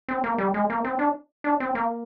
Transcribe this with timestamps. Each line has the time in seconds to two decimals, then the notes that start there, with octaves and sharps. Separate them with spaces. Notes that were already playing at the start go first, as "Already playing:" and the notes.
0.08 C4
0.24 A#3
0.38 G3
0.54 G#3
0.70 A#3
0.84 C4
0.99 D4
1.44 D4
1.60 C4
1.75 A#3